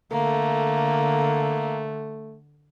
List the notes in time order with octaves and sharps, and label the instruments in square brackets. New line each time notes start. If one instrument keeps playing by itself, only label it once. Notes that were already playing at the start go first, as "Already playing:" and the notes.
[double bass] D3 [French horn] A3 [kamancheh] A#3